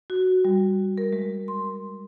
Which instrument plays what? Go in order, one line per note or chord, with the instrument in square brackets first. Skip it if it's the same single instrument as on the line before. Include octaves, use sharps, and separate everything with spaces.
[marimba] F#4
G3
A#4
G#3
C6